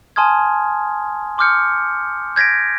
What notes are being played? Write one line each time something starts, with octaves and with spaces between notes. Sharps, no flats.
G#5 A5 C6 D#6 F6 G#6
C6 D6 D#6 F6 G6 C#7
G6 G#6 A#6 B6 D7